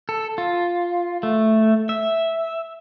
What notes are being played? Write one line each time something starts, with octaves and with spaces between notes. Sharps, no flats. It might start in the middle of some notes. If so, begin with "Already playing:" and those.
A4
F4
A3
E5